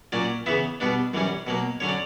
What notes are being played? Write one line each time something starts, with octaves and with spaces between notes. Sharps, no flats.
A#2 F#3 C#4 D5
C#3 E3 B3 E5
B2 G3 B3 D4
F#2 E3 G3 C#4
B2 F#3 A#3
D3 F#3 C#4 C#5
D5